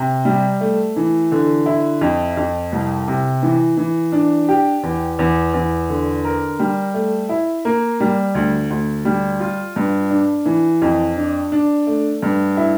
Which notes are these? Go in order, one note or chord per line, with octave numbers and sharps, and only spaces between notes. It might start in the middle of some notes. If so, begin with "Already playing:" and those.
Already playing: C3
G3
A3
E3
D3
E4
F2
F2
C2
C3
E3
E3
D4
G4
E2
E2
E2
D3
A#4
G3
A3
E4
A#3
G3
D2
D2
G3
F4
G2
D4
E3
F2
D4
D4
A3
G2
E4